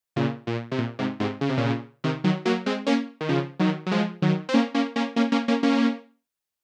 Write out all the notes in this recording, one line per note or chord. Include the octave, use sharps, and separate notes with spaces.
A#2 C#3
A#2
C3
A#2
G#2 C3
G#2 C3
C#3
C3
A#2 C#3
C3 D#3
D#3 F#3
F#3 A#3
G#3 C4
A#3 C#4
D#3
C#3 F3
D#3 F#3
F#3
F3 G#3
D#3 F#3
C4
A#3 C#4
A#3 C#4
A#3 C#4
A#3 C#4
A#3 C#4
A#3 C#4
A#3 C#4